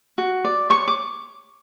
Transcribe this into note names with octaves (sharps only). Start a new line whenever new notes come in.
F#4
D5
C#5 C#6
D6